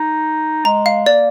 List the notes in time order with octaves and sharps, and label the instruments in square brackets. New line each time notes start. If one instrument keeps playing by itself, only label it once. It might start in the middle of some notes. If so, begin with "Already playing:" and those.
Already playing: [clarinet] D#4
[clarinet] G#3 [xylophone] A#5
[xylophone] F5
[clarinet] A#3 [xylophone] D5